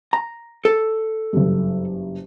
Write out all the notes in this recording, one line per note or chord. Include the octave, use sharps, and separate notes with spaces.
A#5
A4
F#1 G2